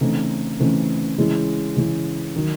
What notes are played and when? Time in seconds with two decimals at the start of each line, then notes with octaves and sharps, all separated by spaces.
0.01 C#3 E3 A3 C4 D#4
0.60 C#3 E3 A3 C4 D#4
1.18 C#3 E3 G#3 C#4 E4
1.76 C#3 E3 G#3 C#4 E4
2.36 D#3 F#3